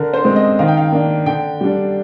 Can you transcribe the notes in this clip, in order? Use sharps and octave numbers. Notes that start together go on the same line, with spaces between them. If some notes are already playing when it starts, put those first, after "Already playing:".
Already playing: D3 A#4
C5
G#3 C4
D#5
D#3 F5
G5
F5
A#3 D4
D3 G5
G3 D4